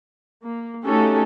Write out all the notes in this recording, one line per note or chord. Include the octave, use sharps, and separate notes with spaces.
A#3
A3 C#4 D#4 F#4 G4 A4